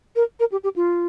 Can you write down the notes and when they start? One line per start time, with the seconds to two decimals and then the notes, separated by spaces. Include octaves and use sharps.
0.16 A#4
0.40 A#4
0.52 G4
0.63 G4
0.76 F4